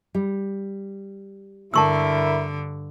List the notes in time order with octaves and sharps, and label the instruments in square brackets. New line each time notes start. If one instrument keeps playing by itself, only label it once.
[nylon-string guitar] G3
[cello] G2 D3 [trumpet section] E4 A#4 [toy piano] A5 C#6 E6